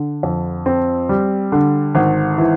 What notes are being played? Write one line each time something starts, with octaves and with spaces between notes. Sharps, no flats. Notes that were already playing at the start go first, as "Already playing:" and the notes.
Already playing: D3
F2
C4
G3
D3
G#1
E3